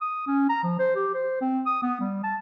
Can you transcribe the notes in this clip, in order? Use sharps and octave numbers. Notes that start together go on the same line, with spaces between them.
D#6
C#4
A#5
F3
C5
G4
C5
C4
D#6
B3
G3
A5